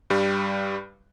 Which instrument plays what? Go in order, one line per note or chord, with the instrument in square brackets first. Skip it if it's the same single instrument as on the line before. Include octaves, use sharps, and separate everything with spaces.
[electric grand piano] G2 G3